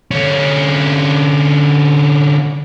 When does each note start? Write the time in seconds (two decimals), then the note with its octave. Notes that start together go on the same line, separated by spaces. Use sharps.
0.11 D3 C#4